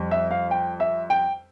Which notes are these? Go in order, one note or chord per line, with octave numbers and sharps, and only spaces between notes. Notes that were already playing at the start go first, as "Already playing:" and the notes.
Already playing: F2 G3
E5
F5
G5
E5
G5